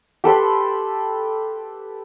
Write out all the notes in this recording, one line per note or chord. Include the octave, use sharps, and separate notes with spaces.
G4 A4 B4 C6